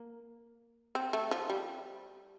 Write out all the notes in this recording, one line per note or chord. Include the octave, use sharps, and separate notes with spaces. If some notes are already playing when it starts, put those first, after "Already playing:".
Already playing: A#3
C4
A3
F3
G3